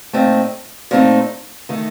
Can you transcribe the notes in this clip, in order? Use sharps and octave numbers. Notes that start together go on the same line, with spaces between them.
A#2 A3 C4 D#4
A#2 A3 C4 D#4
D#3 A3 D#4